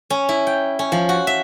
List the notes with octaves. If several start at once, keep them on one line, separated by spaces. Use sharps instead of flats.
C#4
E4
G5
C#4
F3
F#4
E5